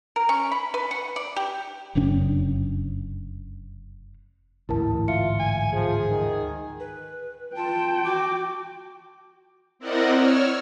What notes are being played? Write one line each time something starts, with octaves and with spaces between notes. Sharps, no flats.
A#4
C#4
B5
B4
F#5
D5
G4
F1 F#2 C#3 D4
A1 D2 G#2 E4 A#4 A5
F4 E5 C#7
G#5
F3 G#4
D#3
B4
F4 G5 A5
F#4 D6
C4 E4 A#4 D5 D#5 F#5
C#5 E6 F6